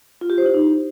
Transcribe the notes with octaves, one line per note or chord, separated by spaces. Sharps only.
F4
G4
C5
E4
D#4